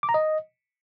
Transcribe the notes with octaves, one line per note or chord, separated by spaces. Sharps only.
D6
A#5
D#5